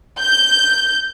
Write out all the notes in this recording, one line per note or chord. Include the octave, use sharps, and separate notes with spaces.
G6